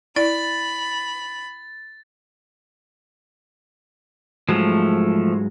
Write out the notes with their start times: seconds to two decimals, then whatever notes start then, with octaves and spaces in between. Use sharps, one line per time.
0.16 E4 D5 B5 A6
4.49 G#2 F3 F#3 G#3 A3